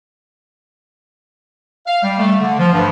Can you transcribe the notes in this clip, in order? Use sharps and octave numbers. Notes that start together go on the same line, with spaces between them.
F5
G3
A3
D3
F3
G2